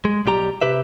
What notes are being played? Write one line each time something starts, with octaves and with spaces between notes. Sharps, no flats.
G#3
B1 G3 G4 A#5
C3 G4 B4 E5